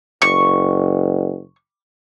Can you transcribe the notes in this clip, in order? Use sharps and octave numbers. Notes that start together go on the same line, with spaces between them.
F#1 C#6